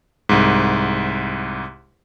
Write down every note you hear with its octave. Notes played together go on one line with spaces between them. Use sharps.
C2 G#2